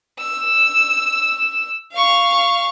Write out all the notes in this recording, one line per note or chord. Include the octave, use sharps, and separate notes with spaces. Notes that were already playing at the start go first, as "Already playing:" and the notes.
E6
F5 C#6